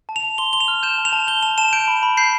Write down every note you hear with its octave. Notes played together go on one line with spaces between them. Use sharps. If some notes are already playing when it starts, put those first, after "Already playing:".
A5
F7
A5
C6 G7
C6 G7
F7
F6
G6 E7
A5
F7
A5
G6 G7
A5 F7
A5 E7
G6 D7
B5
B5
G6 C7